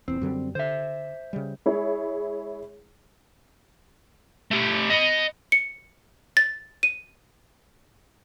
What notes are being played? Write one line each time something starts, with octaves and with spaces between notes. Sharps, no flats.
D#1 E2 C4
F#2 D3 G3
D3 C5 E5
C#3 G3
G#3 E4 G#4 C#5
A3 G4
D#5 B5
C#7
A6
D#7